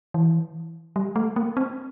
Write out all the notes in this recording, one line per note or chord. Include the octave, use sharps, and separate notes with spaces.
E3
G3
A3
A#3
C4